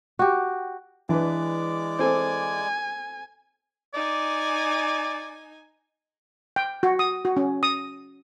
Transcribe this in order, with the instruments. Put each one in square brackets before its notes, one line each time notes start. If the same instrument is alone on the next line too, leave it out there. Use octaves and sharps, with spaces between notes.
[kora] F#4 G4
[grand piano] E3 [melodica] G#3 D5 D6 [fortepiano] D4 B4
[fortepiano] C4 A4 C5 [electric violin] G#5
[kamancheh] D#4 G#5 [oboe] D5
[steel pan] G5
F#4
D#6
F#4
C#4
D#6